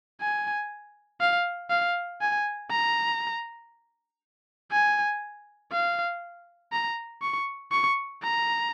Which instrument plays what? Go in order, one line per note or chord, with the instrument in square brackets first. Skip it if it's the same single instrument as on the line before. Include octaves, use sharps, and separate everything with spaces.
[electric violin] G#5
F5
F5
G#5
A#5
G#5
F5
A#5
C#6
C#6
A#5